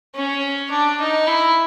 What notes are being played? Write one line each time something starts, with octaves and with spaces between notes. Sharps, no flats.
C#4
D4
D#4
E4